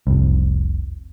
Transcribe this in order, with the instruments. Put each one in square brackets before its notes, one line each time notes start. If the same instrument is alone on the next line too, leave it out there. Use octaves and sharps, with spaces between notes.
[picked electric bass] F1 C2